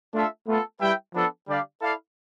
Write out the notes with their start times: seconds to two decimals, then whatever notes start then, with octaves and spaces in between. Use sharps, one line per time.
0.13 A3 D4 F4 A4 E5
0.47 A3 B3 F4 A4
0.81 G3 E4 B4 E5 G5
1.14 F3 B3 D4 A4
1.47 D3 G3 D4 G4 D5 F5
1.81 E4 A4 D5 F5